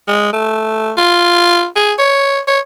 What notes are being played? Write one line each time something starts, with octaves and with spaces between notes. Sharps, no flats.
G#3
A3
F4
G#4
C#5
C#5